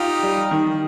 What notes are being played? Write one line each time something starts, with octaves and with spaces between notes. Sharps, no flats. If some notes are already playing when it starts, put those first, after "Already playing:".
Already playing: D#4 F4 G4
G3
D#3